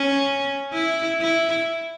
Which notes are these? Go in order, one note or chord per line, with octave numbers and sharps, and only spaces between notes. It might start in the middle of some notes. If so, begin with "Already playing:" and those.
Already playing: C#4
E4
E4